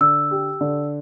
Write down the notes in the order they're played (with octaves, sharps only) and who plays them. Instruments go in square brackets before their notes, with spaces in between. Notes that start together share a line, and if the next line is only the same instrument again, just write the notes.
[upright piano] D3 [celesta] E6
[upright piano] G4
D3